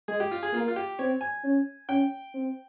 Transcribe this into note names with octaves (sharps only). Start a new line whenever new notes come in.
G#3 G#4
G4
F4
G#4
A#3 F4
F4
G4
C4 C#5
G#5
C#4
C#4 G5
C4